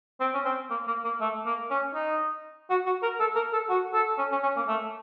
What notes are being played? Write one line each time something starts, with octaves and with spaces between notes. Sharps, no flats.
C4
C#4
C4
A#3
A#3
A#3
A3
A#3
C#4
D#4
F#4
F#4
A#4
A4
A#4
A4
F#4
A4
C#4
C#4
C#4
A#3
A3